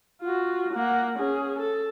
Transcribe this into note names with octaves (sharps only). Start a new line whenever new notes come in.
F4 F#4
A#3 F#5
C#4 G#4
A4